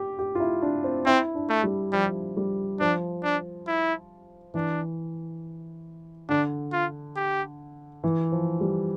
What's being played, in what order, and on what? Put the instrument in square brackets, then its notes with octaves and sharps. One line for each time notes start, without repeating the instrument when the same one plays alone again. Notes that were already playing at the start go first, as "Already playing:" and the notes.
Already playing: [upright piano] G4
G4
F4
E4
D4
C4
[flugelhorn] C4 [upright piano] E4
[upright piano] D4
[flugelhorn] A3
[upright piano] G3
[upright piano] F3 [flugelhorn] G3
[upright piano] G3
[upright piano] F3 [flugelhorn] D4
[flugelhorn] D4
E4
[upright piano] E3 [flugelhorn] D4
[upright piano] D3 [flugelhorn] D4
[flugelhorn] F4
G4
[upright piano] E3
F3
G3